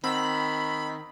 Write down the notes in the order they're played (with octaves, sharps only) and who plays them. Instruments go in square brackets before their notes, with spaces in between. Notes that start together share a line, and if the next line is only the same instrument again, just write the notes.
[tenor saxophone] D#3 [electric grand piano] C4 F#5 E6 [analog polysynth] B5